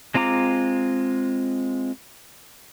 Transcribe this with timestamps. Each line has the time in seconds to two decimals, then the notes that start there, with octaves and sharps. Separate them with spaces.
0.14 G#3 C4 F4 A#5 D6